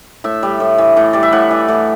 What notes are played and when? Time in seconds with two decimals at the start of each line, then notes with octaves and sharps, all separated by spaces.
0.24 A2 E5
0.43 G3
0.60 A2
0.78 E3
0.97 A2
1.13 G3 D5
1.23 E5
1.32 A2 F#5
1.51 E3
1.68 A2